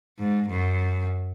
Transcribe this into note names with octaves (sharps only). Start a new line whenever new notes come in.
G#2
F#2